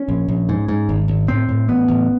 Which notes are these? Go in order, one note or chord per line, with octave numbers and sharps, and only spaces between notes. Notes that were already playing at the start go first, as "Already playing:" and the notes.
Already playing: C#4
A#1
A#1
G#2
G#2
G#1
G#1
A2 C4
A2
A1 B3
A1